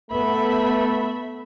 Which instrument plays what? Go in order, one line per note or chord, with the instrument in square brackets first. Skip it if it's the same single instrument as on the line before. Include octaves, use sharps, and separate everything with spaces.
[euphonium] A3 [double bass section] B3 [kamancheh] E5 B5